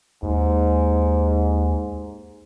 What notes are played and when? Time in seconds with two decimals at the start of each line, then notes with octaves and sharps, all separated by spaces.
0.23 D#2 G#2